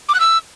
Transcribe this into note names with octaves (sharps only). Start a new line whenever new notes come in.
D6
F#6
E6